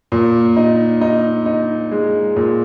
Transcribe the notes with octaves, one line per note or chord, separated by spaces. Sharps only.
A#2
D#4
D#4
D#4
G#3
A#2